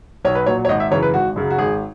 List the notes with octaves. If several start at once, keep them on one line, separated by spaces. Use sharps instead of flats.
B1 C#5
B4
A#2 F#3 C#5
C#5
G#1 D#5
E5
F#2 C#3 E3 C#5
B4
G#1 F#4
F#2 C#3 F#3
F#4
G#1 G#4